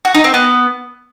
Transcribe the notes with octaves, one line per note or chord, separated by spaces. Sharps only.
F#4
D#4
C4
B3